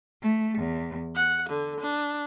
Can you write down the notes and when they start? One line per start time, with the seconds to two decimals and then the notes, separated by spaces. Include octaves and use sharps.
0.22 A3
0.58 E2
1.15 F#5
1.48 D3
1.80 D4